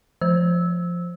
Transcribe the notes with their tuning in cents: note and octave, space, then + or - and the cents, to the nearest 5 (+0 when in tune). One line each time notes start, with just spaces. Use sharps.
F3 +0 C5 +0 E6 -15